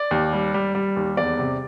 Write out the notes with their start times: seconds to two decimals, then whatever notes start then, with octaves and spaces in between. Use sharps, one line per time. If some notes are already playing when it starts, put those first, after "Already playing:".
Already playing: D5
0.11 D#2
0.33 G3
0.54 G3
0.75 G3
0.97 D#2
1.17 E2 D5
1.39 C3